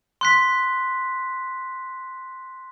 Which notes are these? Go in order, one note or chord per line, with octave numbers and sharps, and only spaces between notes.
C6 F#6 B6